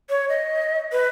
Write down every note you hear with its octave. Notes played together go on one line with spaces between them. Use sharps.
C#5
D#5
B4